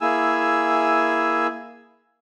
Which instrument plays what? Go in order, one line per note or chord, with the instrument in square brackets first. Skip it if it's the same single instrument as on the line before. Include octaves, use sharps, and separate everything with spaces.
[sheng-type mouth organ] A#3 E4 G#4 G#5 E6